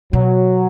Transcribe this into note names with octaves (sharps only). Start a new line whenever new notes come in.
B2 F#3